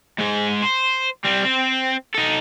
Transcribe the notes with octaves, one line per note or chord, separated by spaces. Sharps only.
G#2 G#3
C5
G3 C4
C4
D#4 A4